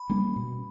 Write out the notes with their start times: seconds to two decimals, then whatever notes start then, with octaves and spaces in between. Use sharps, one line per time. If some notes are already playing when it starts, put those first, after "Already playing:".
Already playing: B5
0.09 G3 A#3 C#4
0.36 B2